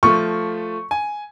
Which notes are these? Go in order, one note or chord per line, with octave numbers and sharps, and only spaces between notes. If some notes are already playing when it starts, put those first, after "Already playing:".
F3 A3 C#6
G#5